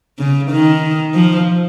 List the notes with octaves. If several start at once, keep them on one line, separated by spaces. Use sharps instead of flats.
C#3
D#3
F3